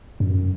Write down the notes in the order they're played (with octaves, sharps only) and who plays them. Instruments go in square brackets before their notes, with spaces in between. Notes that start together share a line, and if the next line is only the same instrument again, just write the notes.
[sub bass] F#2